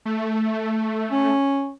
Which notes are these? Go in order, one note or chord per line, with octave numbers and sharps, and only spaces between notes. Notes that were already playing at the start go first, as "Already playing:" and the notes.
A3
C#4